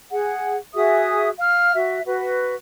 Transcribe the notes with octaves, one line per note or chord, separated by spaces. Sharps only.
G#4 F#5
F#4 G#4 E5 D#6
F5 F6
F#4 E5
F#4 B4